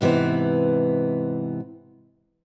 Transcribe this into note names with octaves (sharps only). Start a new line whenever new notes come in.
G#2 C3 E3 B3 C5